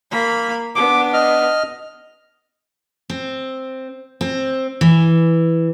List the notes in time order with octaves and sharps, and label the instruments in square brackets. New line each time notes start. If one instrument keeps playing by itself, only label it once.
[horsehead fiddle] A#3 B5
[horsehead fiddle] B3 D4 [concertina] D6
[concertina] D#5 F6
[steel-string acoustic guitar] C4
C4
E3